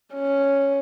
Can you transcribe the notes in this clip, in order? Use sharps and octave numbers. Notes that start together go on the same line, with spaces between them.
C#4